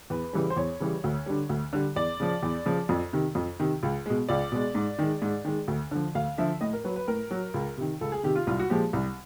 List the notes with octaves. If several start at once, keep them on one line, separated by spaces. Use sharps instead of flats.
E2 B4
C#3 E3 G3
C5
E2 C#5
C#3 E3 G3
D2
D3 G3
D2
D3 G3
E2 D5
C#3 F3
E2
C#3 F3
F2
C3 D#3
F2
C3 D#3
C#2
B2 G#3
C#2 D5
B2 G#3
G#2
D#3 G#3
G#2
D#3 G#3
D2
D3 F3
D2 F5
D3 F3 E5
A2 D#5
A#4
F#3 B4
B4
A2 A#4
F#3
C#2
C3 D#3
C#2 A4
G#4
C3 D#3 G4
F4
C2 F4
F#4
A#2 F3 G#3 G4
C2